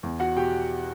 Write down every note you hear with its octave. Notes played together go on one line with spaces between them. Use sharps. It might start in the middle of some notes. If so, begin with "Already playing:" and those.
E2
F#4 F#5
B2 G4 G5